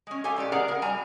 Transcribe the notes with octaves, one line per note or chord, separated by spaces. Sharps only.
G#3 C#4
G4 A4 C#5 F5 G#5
A#2 G#3 G4 D5
D4 G#4 A#4 D5 F#5 A#5
C#3 A#4 F#5
F#3 G3 G#5 A#5